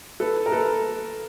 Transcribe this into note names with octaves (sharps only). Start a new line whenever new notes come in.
A4 B4
A#4
A4 B4